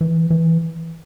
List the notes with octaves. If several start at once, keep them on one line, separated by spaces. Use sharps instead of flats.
E3
E3